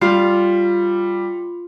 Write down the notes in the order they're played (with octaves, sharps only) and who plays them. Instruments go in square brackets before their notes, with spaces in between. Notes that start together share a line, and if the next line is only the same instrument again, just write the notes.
[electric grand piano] G3 [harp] F4